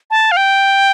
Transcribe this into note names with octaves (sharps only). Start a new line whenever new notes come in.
A5
F5
G5